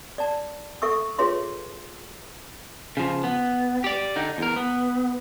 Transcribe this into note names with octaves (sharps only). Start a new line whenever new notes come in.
D5 A5
A4 E5 C#6 E6
F4 G#4 B4 C#5 E5 C6
C#3 F3
B3
G4 D5
D3 D#4
E2 A#4
B3